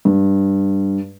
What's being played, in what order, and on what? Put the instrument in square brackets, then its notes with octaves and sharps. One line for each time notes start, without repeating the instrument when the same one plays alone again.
[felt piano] G2